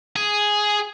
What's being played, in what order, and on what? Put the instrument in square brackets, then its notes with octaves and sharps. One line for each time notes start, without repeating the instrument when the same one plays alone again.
[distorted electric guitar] G#4